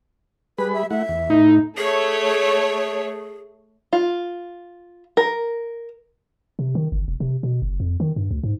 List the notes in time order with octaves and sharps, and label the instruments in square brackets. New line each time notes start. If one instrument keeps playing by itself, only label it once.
[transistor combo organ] G3 G#4 B5 [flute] B4
[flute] E5
[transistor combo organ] A3 E4 F#5 [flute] E5
[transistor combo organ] E2
[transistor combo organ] A2 E4 [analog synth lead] D#4
[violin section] A3 C#5 [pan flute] G#4
[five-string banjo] F4
A#4
[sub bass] C3
D#3
G1
E1
C3
B2
F#1
F2
D#3
G2
D2
G#2